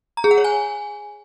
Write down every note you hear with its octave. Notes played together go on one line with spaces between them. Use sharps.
A#5
G#4
F#5
C#5
G#5